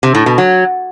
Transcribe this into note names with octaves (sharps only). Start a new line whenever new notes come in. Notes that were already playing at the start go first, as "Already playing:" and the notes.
C3
A2
B2
F#3